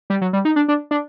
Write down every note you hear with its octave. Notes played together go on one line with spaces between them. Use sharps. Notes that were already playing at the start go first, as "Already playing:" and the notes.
G3
F#3
G3
D#4
D4
D4
D4